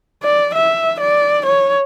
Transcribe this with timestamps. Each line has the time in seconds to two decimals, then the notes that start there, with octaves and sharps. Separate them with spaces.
0.23 D5
0.55 E5
1.00 D5
1.46 C#5